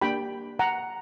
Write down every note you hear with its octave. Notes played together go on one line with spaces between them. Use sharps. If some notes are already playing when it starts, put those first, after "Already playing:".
A#3 D4 G4 G5 B5
F#5 A#5